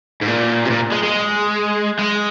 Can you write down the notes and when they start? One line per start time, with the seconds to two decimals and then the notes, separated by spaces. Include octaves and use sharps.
0.22 G#2
0.28 A#2
0.65 C3
0.70 A#2
0.92 G#3
1.03 G#3
1.99 G#3